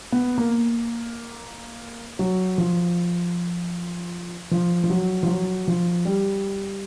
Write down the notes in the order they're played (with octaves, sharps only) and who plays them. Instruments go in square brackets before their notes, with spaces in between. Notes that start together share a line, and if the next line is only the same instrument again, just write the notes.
[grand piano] B3
A#3
F#3
F3
F3
F3
F#3
F3
F#3
F3
G3